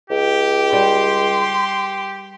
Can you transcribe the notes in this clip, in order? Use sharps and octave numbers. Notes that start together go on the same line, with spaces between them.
C#2 G4
G3 G5 C6